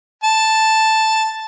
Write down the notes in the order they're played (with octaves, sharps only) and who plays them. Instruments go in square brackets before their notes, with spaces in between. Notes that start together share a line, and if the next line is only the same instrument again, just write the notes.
[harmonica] A5